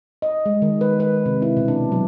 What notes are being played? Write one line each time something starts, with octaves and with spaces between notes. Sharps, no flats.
D#5
G#3
D#3
B4
B4
C3
E4
B2
D4
F#3